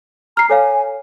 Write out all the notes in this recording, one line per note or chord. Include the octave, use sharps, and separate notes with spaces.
A#5 F6 C7
A4 C#5 F5 G#5